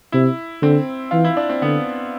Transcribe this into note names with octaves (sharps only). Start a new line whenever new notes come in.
C3 E4
D3 C4
E3 F4
E4
D4
C4
D3 B3